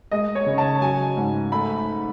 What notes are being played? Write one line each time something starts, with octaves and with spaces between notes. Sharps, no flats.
G#3 D#5
C#5
C#3
A5
F#3 G#5
G#2
A3 B5